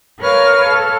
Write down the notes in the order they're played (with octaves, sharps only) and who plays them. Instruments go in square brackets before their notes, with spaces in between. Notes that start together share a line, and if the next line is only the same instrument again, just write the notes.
[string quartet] A#4 B4 C#5 F5 F6
A4